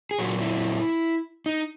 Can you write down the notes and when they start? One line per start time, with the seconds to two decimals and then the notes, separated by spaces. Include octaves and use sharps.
0.11 G#4
0.19 A#2 F#3 F#4
0.41 E4
1.46 D#4